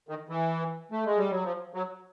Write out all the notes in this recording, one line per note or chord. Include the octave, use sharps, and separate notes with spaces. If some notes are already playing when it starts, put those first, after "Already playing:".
D#3
E3
A3
G#3
G3
F#3
F3
F#3